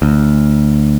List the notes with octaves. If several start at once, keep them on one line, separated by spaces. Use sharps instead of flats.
D2